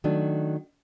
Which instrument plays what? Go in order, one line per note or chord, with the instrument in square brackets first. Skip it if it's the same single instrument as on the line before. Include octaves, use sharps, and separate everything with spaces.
[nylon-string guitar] D#3 F#3 A3 D4